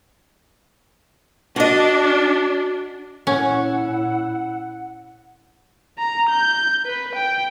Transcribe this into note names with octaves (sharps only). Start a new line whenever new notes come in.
D4 F#4 D#5
A#2 C#4 E4 F#5
A#5
G6
B4
G5